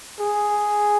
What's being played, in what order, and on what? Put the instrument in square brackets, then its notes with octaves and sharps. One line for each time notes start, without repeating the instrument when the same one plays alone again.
[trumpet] G#4